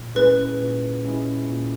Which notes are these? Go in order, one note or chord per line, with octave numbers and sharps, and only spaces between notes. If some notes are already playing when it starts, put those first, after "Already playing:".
Already playing: A#2
G#3 C#4 E4 G#4 B4
A#2
G#3 C#4 E4 G#4
A#2